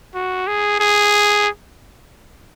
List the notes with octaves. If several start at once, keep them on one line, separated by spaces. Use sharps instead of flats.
F#4
G#4
G#4